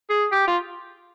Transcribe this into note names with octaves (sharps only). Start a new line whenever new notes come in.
G#4
G4
F4